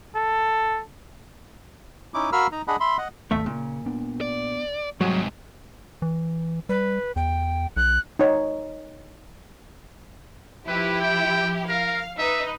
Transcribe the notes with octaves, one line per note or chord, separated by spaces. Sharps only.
A4
C#4 D#4 E4 D6
F#4 A#4 F5 B5 E6 F6
D#4 A#5
D4 G#4 D#5 F#5 B5
E5 B5 C6
D#5 F#5
G#1 D#2 A3 E5
A#2 C#3
B3 D4
D5
G#2 C3 F#3 G3 A3
E3
G3 B4
E2 G5
B1 F#6
D#4 C#5
F3 E4 G4 B4
G5
A#4 F5
D#4 B4 E5